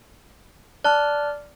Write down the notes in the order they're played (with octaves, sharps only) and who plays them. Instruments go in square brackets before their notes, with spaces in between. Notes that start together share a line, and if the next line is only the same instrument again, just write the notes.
[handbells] D5 F6 [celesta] A5 F#6